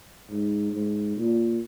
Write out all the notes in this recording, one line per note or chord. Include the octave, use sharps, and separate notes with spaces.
G#2
G#2
A#2